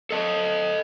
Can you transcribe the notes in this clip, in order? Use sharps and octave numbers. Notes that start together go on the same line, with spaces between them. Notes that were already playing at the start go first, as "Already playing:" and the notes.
A4 D#5 A5